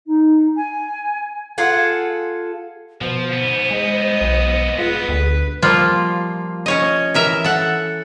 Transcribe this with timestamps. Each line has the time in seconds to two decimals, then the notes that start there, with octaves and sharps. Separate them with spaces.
0.06 D#4
0.57 G#5
1.58 F4 G#4 A4 F#5
3.01 B2 F3 C5
3.33 G#2 B3
3.71 G#3 D#5
4.21 B1
4.78 F4 G#4 B4
5.08 D2
5.62 F3 G3 A#3 F4
6.66 C#4 C#5 D#5
7.14 E3 A#4 E5
7.44 A4 F#5